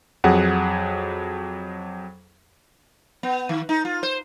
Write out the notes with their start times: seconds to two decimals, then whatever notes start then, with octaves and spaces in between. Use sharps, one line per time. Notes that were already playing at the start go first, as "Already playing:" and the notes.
0.24 F2 F#3 G#4 F#5
3.23 B3
3.49 D#3
3.69 D#4
3.85 F4
4.03 C5